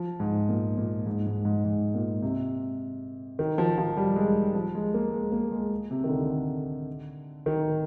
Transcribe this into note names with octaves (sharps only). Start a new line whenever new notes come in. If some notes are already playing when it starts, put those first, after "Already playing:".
Already playing: F3
G#2
A#2
A#2
G#2
G#2
G#2
G#2
A#2
C3
D#3
F3
F3
G3
G#3
F3
G#3
A#3
G#3
A#3
G#3
C3
D#3
D3
D#3